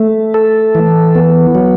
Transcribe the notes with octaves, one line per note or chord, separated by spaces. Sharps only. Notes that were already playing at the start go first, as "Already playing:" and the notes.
Already playing: A3
A4
E3
B3
F#3